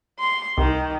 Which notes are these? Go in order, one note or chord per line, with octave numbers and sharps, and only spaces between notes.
C6
C2 D#3